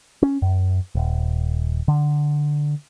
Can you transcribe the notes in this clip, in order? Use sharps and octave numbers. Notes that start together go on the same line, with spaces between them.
C#4
F#2
D#1
D3